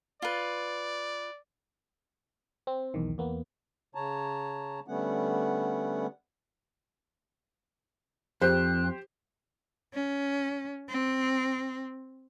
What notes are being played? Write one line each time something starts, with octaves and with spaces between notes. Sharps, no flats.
F4 B4 D5
C4
B1 E2 D#3
E2 A#3 B3
C#3 C#5 A5 A#5
D3 G3 A3 B3 C#4 F#5
F2 G4 C5 F#6
C#4
C4